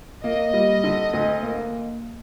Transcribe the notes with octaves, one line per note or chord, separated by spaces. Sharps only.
A#3 D#5
G3
D3
D2
A#3